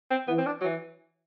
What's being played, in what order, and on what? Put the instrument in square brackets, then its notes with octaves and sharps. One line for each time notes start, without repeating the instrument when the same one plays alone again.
[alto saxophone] C4
[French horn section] E3 [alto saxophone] B3
[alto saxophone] C4
D4
F#3
E3